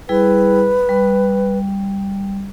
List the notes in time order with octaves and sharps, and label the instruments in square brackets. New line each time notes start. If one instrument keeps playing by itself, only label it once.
[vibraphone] G3 E4 G#4 [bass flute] B4
[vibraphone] G3